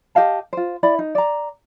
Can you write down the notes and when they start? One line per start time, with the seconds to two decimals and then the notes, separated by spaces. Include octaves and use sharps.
0.15 G4 D#5 F5 A5
0.53 F4 C5
0.83 E4 D5 B5
0.99 D#4
1.15 D5 A#5